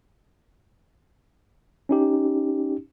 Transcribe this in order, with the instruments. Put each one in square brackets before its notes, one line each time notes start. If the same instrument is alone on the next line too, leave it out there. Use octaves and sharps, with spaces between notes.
[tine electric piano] C#4 D#4 G4